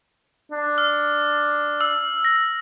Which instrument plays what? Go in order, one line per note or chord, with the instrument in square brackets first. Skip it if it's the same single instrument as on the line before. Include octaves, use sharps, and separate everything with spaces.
[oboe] D4
[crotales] F6
E6
A#6